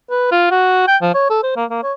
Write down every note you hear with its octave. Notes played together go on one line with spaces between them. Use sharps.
B4
F4
F#4
G5
F3
C#5
A4
C5
A#3
A#3
C#5